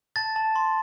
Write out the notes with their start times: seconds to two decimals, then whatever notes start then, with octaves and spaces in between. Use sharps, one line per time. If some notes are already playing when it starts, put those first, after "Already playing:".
0.16 A5 A6
0.36 A5
0.56 C6